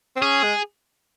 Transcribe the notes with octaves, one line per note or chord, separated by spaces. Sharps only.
C4
C#4 G#4
G#3